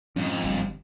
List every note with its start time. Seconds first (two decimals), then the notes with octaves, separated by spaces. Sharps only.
0.16 F2 G#2 C#4
0.44 G1 G3